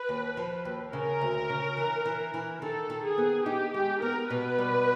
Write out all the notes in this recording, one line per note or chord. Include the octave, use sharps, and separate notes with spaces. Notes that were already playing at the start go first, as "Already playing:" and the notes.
Already playing: B4
D#2
F3
D#2
C#3 A#4
D2
C#3
E3
E3
E3
D#3 A4
D#3
G#4
B3
D#4 G4
G#3 G4
B3 A#4
B2 B4
G3